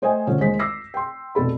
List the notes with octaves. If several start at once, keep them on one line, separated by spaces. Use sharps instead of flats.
A3 C5 D#5 G5 G#5
D3 F3 C#4
D#2 G#3 G#4 C5 B6
D6 E6 A#6 C7
G5 C6
F1 B2 A4 B5